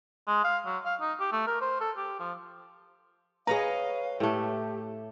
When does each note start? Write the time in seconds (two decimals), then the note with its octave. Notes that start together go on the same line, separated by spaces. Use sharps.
0.28 G#3
0.44 F5
0.66 F#3
0.85 F5
1.01 D#4
1.20 G4
1.32 A3
1.47 A#4
1.62 C5
1.81 A4
1.97 G4
2.19 F3
3.47 G#4 B4 C#5 D#5 F5 A#5
4.20 A2 A3 G4